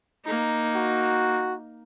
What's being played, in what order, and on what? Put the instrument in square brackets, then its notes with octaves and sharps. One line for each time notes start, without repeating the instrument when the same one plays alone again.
[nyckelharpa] A#3 D#4
[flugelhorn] F#4